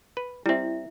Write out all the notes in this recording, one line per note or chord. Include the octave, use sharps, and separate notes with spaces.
B4
G3 C4 E4 E5